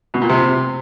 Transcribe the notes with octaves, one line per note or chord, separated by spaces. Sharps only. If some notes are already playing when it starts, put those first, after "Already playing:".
B2
A#2
C3